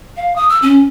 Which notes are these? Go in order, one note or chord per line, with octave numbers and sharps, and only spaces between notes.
F5
D#6
E6
C#4